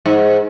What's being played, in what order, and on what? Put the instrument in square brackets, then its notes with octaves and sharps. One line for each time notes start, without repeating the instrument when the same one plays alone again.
[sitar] G#2